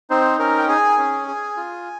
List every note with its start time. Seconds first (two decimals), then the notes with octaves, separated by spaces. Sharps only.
0.10 C4 D#4 C5
0.39 C#4 A#4 A#5
0.58 G5
0.69 G#4 G#5
0.98 C#4
1.28 G#4
1.57 F4